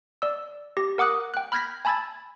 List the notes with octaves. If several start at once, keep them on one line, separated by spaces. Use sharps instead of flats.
D5 E6
G4 A#6
A#4 F#5 D6 D#6 F#6
G5 F#6
B5 F6 G6 G#6 A#6 B6
G#5 A5 B5 E6 G#6 A6